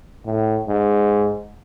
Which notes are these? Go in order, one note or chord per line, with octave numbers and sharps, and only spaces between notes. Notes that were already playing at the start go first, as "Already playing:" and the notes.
A2
G#2